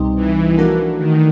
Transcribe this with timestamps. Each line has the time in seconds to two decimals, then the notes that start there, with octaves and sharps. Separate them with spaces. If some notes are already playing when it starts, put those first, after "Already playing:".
Already playing: C2 B2 G3 C4 D#4
0.16 E3
0.58 F3 A3 D4 F#4 A#4
0.99 D#3